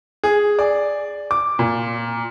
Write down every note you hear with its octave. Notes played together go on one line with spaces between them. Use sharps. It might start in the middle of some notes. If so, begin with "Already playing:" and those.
G#4
D5
D6
A#2